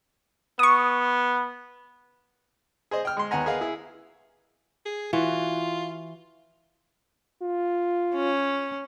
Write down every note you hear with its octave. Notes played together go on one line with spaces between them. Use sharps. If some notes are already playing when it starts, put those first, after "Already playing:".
B3 C#6 D#6
G#4 C5 D#5
G5 F6
G#3 C6
D#2 B3 F#5 G#5 A#5
G#4 A#4 B4 D#5 F5 F#5
E4 G#4
G#4
E3 F4 F#4
F4
C#4